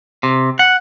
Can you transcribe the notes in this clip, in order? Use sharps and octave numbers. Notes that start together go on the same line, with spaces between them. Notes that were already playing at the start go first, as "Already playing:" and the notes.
C3
F#5